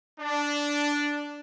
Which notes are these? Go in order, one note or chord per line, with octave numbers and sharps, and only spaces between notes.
D4